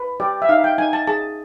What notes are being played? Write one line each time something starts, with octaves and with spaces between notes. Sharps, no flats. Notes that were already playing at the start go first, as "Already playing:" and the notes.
Already playing: B4
G4 D5
E5
D#4 F5
G5
D#4 G#5
A5
G#4 A5